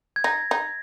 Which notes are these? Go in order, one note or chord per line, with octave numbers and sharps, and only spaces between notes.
G#6
D#4 A#6
D#4